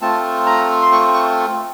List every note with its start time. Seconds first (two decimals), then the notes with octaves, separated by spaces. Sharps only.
0.01 A3 C4 F4 A5
0.46 A#5
0.82 C6
0.92 C#6
1.14 C#6